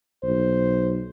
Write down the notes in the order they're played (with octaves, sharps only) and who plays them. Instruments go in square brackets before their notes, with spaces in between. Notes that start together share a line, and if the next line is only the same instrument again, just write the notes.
[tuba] B1 [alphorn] C5